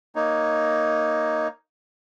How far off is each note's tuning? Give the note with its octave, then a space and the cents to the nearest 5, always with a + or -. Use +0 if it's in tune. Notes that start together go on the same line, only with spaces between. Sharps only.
A#3 +0 D#4 +0 C#5 +0